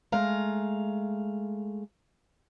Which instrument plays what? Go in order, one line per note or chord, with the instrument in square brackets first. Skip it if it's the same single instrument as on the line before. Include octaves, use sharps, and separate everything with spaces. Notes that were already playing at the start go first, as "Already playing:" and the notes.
[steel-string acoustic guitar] G#3 A3 F5 A#5